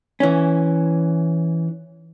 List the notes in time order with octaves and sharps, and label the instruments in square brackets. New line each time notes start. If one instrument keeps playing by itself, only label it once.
[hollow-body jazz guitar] E3 C#4